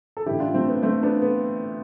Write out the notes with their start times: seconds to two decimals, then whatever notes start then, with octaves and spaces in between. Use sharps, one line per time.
0.17 A4
0.26 A1 G2 D3 E4 G4
0.40 D4 F4
0.54 A3 C4
0.68 B3
0.83 A3 C4
1.03 B3 D4
1.22 B3